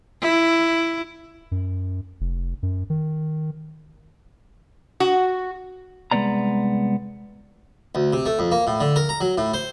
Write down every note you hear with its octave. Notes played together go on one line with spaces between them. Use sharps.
E4
F#2
F1
F#2
D#3
F#4
C2 G#3 A3 B3 D5 A#5
D2
C3
A3
F2
A#3
A2
D3
A#4
A#5
F#3
A2
C5